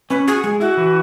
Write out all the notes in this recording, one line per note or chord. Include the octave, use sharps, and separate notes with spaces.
C#4 B4
F#4 G#4
G#3 G#4
E4 F#4
E3